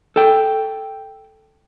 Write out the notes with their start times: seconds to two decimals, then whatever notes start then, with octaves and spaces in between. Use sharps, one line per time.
0.16 A4 G5